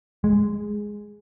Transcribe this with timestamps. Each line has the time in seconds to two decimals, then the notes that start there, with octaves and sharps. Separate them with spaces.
0.24 G#3